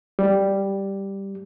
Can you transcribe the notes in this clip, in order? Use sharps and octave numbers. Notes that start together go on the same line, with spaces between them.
G3